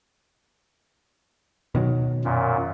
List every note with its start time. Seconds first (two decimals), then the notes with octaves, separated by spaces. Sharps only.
1.75 B2 D#3 F#3
2.25 F#2 A#2